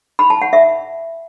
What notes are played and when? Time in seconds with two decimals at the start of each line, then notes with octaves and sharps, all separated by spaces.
0.19 B5
0.30 A5
0.42 F#5
0.53 E5